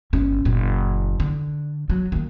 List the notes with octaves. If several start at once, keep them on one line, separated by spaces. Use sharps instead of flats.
G1 C#4
F#1 A#2
D3
F#3
D#3 A#3